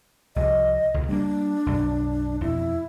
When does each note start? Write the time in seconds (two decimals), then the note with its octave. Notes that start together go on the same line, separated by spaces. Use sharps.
0.36 C2 F3 D#5
0.94 C#2 B2
1.09 G3 A3 A#3 D4
1.66 B1 F#2 F#3
2.41 F2 B2 E4